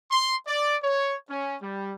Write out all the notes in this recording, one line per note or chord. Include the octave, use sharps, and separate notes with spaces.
C6
D5
C#5
C#4
G3